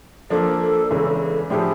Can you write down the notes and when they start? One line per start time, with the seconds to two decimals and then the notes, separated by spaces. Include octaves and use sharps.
0.30 F3 A#3 D4 A4
0.91 E2 C#3 E3 G#3
1.50 A2 F3 A3 D4 G4 G#4